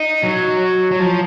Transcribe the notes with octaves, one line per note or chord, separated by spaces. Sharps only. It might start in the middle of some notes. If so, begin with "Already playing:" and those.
Already playing: D#4
F#3
F#3
F3